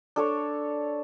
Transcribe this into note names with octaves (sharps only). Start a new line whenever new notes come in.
D4 A4 C#5